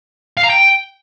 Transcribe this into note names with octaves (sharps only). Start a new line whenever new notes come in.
F5
A#5
G5